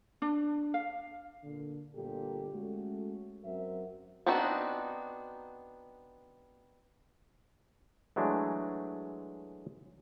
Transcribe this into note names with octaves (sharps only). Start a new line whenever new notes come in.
D4
F5
A#2 D3
G1 D2 A#2 G4 A4
G#3 A3 C#4 F#4 A4
F#2 C4 F#4 A#4 E5
B3 C4 D4 D#4 F#4
E3 F#3 G#3 A3 D4